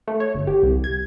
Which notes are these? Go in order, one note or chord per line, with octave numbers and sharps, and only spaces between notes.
A3
C#5
G1
G4
C2
G#6